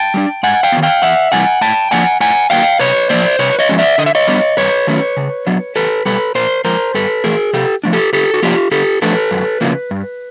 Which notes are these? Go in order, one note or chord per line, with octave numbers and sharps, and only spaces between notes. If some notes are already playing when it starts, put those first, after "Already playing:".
Already playing: G5 A5
G3 B3 D4
G#2 F#5 G#5
F5 G5
D#3 F#3 B3
F5 G5
E2 E5 F#5
C3 E3 G3 F#5 G#5
A2 G5 A5
F3 A#3 D4 F#5 G#5
A2 F#5 G#5
F#3 A#3 F5 G5
C3 B4 C#5
F3 A#3 C5 D5
C3 B4 C#5
C#5 D#5
F3 G#3 C#4
D5 E5
D3 D#5
E5
C#5 D#5
G3 B3 D4
G2 B4 C#5
D#3 F#3 A3 C#4
C#3
F#3 B3 D4
E2 A4 B4
B2 G3 A4 B4
A#2 A#4 C5
F3 G#3 A#4 C5
G2 A4 B4
E3 A3 G#4 A#4
C3 G4 A4
F3 A3 D4
G4 A4
D3 G4 A4
F#4
F3 A#3 D4 F4 G4
D3 G4 A4
F3 A3 D4 A4 B4
F#2
C#3 F3 A#3
G2